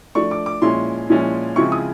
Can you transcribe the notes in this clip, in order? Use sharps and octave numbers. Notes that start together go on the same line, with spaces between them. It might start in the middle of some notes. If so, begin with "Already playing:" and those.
F3 A3 D4 C#6
D6
D6
A#2 F3 G#3 C#4 E4 C6
A#2 F3 G#3 C#4 E4
C#3 F3 G#3 C4 E4 C#6
D#6